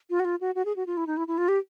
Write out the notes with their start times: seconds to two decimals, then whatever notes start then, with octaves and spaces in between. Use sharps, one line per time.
0.10 F4
0.20 F#4
0.25 F4
0.41 F#4
0.55 F#4
0.65 G#4
0.76 F#4
0.87 F4
0.97 E4
1.07 D#4
1.17 E4
1.28 E4
1.38 F4
1.48 G4